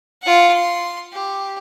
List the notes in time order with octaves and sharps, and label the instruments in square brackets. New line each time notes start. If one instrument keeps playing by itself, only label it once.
[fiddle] F4 F#5
C6
G4